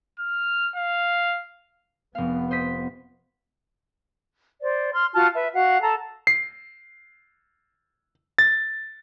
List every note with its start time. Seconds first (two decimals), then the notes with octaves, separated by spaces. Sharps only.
0.19 F6
0.76 F5
2.15 F1 B3 F5
2.51 C5 D#5 B6
4.61 C5 D5
4.93 C6 F6
5.13 F4 F#4 A5 F6
5.34 B4 E5
5.54 F#4 F5 F#5
5.82 A4 A5 A#5
6.27 C7
8.39 A6